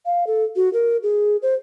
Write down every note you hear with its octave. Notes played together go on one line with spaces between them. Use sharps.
F5
A4
F#4
A#4
G#4
C5